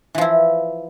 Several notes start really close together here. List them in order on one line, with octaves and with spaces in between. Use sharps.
E3 F3 E4